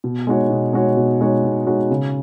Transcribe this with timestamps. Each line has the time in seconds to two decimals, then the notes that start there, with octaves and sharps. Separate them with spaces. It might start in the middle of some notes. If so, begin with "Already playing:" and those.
0.04 B2
0.27 G#3 D#4 F#4 C#5
0.50 B2
0.73 G#3 D#4 F#4 C#5
0.97 B2
1.20 G#3 D#4 F#4 C#5
1.44 B2
1.66 G#3 D#4 F#4 C#5
1.90 C#3